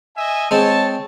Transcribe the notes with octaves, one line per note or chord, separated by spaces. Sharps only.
D#5 E5 G#5
G#3 C4 C#5 A5